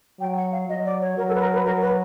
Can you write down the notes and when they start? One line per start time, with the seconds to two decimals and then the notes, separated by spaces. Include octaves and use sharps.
0.20 F#3 G5
0.37 F#5
0.52 F5
0.68 F#3 D#5
0.85 D5
1.01 C#5
1.17 F#3 A#4
1.29 A4
1.35 B4
1.41 A#4
1.54 B4
1.65 F#3 A#4
1.81 B4